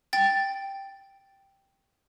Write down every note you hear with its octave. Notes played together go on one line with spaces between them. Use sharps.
G5 A6